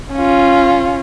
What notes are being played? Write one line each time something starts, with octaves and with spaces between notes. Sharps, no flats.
C#4 F4